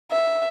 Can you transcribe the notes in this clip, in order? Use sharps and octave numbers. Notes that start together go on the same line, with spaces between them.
E5